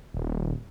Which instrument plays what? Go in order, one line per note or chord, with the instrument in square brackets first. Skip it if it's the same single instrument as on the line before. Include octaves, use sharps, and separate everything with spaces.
[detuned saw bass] D#1